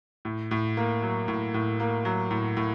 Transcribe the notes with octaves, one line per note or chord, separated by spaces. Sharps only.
A2
A2
A#3
F#3
A2
A2
A#3
F#3
A2
A2